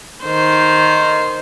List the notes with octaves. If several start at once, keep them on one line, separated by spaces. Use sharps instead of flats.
D#3 C5